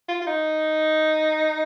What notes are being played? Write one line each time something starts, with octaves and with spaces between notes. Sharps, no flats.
F4
F4
D#4